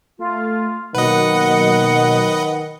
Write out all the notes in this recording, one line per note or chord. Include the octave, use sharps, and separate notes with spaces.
A3 F4
B2 D#3 F#3 A#3 B4 D#5 F#5